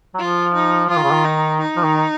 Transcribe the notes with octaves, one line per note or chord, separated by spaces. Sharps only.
F#3
F3 F4
D#4
F3 F4
D#3
C#3
D#3
D#4
D#4
F3
D#3